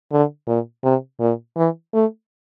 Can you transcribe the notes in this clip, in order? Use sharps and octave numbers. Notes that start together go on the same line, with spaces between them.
D3
A#2
C3
A#2
E3
A3